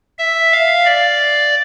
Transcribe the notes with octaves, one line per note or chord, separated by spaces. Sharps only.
E5
F5
D5